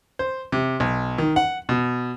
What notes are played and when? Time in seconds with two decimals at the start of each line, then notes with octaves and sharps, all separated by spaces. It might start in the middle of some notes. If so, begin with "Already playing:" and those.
0.19 C5
0.52 C3
0.80 B1
1.18 D#3
1.36 F#5
1.69 B2